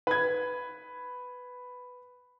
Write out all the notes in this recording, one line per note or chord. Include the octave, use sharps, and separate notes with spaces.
B4 G#6